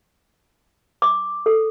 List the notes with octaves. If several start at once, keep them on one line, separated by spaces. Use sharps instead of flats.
D6
A4